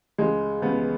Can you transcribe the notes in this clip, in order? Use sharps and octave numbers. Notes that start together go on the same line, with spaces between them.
C#2 G#3
C#2 B3